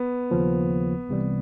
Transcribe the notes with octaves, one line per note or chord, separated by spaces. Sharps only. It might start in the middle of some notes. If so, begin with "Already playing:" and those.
Already playing: B3
D#2 C#3 F3 A#3
C2 C3 E3 G3